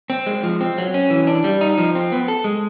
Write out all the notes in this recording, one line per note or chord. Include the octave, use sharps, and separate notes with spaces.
C4
G#3
F3
C4
F#3
C#4
E3
D4
G3
D#4
F3
C4
B3
A4
G#3